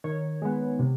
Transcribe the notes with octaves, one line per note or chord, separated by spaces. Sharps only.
D#3 C#5
G#3 B3
C3